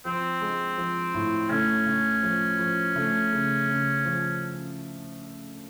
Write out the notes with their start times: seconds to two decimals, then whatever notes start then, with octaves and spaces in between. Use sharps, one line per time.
0.05 F3 C4
0.41 G#3
0.78 F3
1.14 A2
1.50 A3 C#4
1.86 A3
2.23 F3
2.59 F3
2.96 A3
3.32 C#3
3.68 C#3
4.05 F3